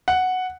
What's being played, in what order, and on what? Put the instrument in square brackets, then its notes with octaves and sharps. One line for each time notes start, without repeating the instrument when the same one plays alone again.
[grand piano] F#5